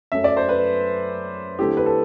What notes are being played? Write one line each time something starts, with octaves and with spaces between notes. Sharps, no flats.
F#2 F#3 A3 E5
D5
C5
B4
D3 A3 C4 E4 G4
B4
A4